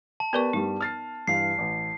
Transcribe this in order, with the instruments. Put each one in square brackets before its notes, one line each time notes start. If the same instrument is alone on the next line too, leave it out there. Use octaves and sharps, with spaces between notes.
[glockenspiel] A5
[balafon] B3 A#4 C#6 [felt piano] G4 B4 D5
[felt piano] G2 G3 [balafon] D#4
[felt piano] F6 A6 C7
[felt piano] G2 E3 F5 [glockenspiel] C7
[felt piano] A1